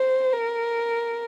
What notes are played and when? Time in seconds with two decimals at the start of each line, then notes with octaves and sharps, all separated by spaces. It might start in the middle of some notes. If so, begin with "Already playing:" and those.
Already playing: C5
0.33 A#4